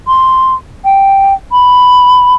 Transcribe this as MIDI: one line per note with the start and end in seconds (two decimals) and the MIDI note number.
0.07 0.54 84
0.85 1.34 79
1.52 2.35 83